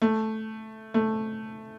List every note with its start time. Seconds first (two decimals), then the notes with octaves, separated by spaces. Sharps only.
0.02 A3
0.94 A3